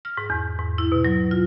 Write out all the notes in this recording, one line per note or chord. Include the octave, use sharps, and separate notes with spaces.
F6
G#2
E2
G#2
E4
B2
F#3
F4